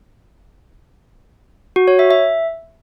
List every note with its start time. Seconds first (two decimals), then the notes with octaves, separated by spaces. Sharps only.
1.76 F#4
1.88 C#5
1.99 E5
2.11 E5